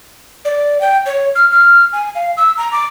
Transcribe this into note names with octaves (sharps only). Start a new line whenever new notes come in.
D5
G5
C#5
F6
F6
G#5
F5
E6
A#5
D6